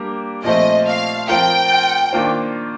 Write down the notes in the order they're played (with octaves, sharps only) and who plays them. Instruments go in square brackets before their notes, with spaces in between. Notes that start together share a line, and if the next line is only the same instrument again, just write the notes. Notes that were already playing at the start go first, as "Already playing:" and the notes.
Already playing: [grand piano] G3 A#3 D4 G4 A#4
[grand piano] A#2 F3 A3 C4 [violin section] D#5
[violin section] F5
[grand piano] F3 C4 F4 A#4 [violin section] G5
[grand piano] D#3 A#3 D4 F4 C5